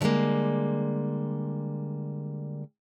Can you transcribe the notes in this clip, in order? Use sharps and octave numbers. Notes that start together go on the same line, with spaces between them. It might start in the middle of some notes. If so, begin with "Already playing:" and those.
D3 F3 G3 G#3 A#3